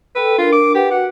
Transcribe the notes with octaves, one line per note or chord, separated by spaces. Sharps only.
A4 B4 G5 E6
D4 F4 A#4
D6
G4 B4 F#5
F#4 F#5